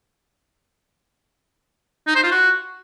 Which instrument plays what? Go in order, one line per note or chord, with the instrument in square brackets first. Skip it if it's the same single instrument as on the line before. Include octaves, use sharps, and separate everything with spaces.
[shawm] D#4
C5
F4
F#4